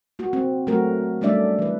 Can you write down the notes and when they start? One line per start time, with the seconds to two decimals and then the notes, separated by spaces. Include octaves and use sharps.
0.19 A#3 F#4
0.33 C4
0.67 F#3 A3 A#3 F#4 A#4
1.21 G3 A3 C#4 D4 D5 E5
1.59 E3 B4